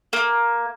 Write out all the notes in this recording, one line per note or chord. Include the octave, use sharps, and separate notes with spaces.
A#3